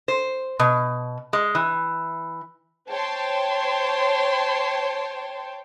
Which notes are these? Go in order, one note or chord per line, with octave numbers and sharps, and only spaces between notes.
C5
B2
G#3
E3
C5 C#5 G5 A5 C6